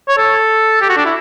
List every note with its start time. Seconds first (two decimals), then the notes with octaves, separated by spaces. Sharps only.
0.09 C#5
0.18 A4
0.82 G4
0.89 F#4
0.97 D4
1.05 E4